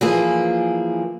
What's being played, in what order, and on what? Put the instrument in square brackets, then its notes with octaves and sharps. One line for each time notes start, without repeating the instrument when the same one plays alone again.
[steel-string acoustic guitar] E3 F3 A#3 G#4